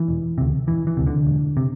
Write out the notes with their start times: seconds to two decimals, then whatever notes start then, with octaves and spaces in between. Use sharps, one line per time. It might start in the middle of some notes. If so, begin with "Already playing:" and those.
Already playing: E3
0.08 E1
0.38 D2 C3
0.67 E1 E3
0.87 E3
0.97 D2 C3
1.06 D3
1.27 E1
1.57 C3